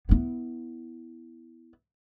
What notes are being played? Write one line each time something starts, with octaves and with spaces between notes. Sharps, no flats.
B3 E4